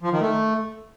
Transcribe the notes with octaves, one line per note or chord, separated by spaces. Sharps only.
F3
D#3
A3